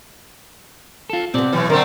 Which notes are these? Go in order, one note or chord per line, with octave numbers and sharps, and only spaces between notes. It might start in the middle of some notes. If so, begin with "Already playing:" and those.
F4 A4
C3 B3 C4 D5
B1 A2 E3
D3 A3 C4 A#4